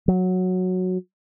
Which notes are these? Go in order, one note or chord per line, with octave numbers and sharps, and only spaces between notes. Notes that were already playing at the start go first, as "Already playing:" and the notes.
F#3